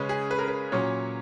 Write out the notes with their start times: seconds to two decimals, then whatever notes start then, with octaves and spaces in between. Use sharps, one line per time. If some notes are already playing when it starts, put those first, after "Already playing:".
Already playing: C#3 G#3 C#4 B4
0.09 G#4
0.31 B4
0.39 A#4
0.48 B4
0.72 A#2 F#3 C#4 C#5